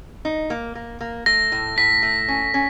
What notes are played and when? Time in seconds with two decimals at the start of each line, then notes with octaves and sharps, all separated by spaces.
0.25 D#4
0.50 A#3
0.75 A#3
1.01 A#3
1.26 A3 A#6
1.52 A2
1.78 A2 B6
2.02 A3
2.28 C#4
2.54 C#4